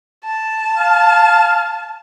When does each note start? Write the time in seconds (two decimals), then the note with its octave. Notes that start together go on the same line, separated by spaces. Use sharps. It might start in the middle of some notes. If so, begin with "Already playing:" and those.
0.24 A5
0.77 F5